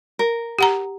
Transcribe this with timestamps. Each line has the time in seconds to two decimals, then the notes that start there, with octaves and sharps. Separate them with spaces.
0.19 A#4
0.59 G4 F#5 A#5